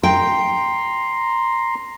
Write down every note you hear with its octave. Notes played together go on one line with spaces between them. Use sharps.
G5 A#5 C6